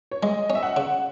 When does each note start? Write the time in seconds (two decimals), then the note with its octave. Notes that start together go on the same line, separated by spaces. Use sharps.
0.12 C#5
0.22 G#3 D#5
0.50 C#4
0.55 E5
0.63 F#5
0.77 C#3